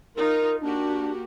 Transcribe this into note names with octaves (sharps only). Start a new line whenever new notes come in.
D#4 F4 A#4
A#3 D4 F#4 G4